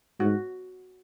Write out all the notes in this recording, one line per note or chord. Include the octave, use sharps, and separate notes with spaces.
G#2 F#4